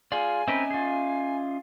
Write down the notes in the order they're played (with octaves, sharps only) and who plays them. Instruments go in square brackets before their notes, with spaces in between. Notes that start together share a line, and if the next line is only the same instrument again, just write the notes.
[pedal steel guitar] F4 [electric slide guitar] G#4 D5 [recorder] G#5
[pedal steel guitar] C4 A#4 B4 [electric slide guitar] C#4 D#5 E5
[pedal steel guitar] F4 G#4